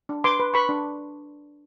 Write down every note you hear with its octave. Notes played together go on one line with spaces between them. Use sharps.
D4
B4 C6 D6
B4
B4 B5 C#6
D4